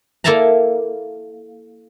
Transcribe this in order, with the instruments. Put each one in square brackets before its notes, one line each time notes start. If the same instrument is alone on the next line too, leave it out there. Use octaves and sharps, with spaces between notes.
[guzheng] A#3 E4 A4 E5 A5 A#5